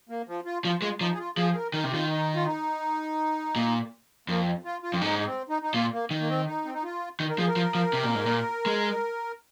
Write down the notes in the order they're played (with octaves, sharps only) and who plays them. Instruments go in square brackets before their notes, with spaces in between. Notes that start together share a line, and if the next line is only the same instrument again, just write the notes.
[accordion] A#3
F3
F4
[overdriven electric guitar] F3 [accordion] F4
[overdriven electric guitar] G#3 [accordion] F4
[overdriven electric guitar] F3 [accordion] D#4
[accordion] G#4
F4
[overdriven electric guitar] F3 [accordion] G#4
[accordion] G#4
A#4
[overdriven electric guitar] D#3 [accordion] A#4
[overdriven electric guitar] C3
[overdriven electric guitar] D#3 [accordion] F4
[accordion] D#4
F4
D#4
[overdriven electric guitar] A#2
[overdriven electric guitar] F2 [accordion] A#3
[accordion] F4
F4
[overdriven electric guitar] F2
[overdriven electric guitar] G#2 [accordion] D#4
[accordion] D#4
C4
D#4
D#4
[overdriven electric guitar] A#2 [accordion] F4
[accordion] A#3
[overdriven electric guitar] D#3
[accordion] A#3
C4
D#4
C4
D#4
F4
[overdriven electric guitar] D#3
[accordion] A#4
[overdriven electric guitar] F3 [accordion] G#4
[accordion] A#4
[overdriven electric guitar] F3
F3
C3
A#2
G#2
A#2
G#3